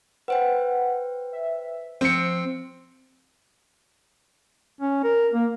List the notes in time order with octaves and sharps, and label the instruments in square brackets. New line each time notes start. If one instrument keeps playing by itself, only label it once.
[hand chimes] B4 C5 G5 [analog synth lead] F#5
[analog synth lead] E5
[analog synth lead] F3 [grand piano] C4 C#7 [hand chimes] C5 C7
[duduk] C#4
A#4
A#3